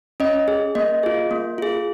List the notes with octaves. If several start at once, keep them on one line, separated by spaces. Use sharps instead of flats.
C#4 D#5
G#4
A#3 D#5
F4 G#4
A#3
F4 G#4